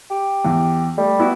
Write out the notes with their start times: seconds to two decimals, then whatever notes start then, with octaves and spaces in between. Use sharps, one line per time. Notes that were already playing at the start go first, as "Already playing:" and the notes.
0.10 G4
0.44 E2
0.98 G3 A3
1.19 B3 E4 F#4